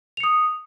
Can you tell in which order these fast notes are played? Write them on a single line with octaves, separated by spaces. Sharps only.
F7 C#7 D#6